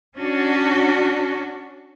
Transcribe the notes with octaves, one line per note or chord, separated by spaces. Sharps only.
C#4 D4 F#4